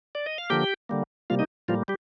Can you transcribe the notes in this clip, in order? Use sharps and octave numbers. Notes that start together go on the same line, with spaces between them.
D5
D#5
F5
D3 F3 A#3 G4 G5
D3 G3 A#3
C3 G3 A#3 F4 F5
D#4 D#5
A2 F3 G3 A#3 F4
G3 G4